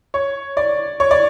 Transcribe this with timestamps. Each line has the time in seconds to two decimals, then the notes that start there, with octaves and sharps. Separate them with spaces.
0.14 C#5
0.57 D5
1.00 C#5
1.11 D5